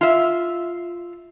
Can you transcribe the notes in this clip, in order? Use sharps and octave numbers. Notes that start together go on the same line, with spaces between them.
F4 E5